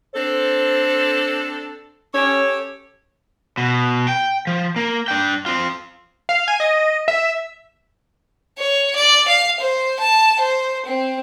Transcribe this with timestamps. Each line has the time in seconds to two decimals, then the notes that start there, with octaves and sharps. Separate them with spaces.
0.15 C4 D4 A4 C5
2.14 C#4 G4 A4 C#5
3.58 B2
4.08 G5
4.47 F3
4.76 A#3
5.08 D4 G5
5.46 C4 F4
6.29 F5
6.48 G#5
6.60 D#5
7.08 E5
8.58 C#5
8.96 D5
9.28 F5
9.60 C5
10.00 A5
10.40 C5
10.86 C4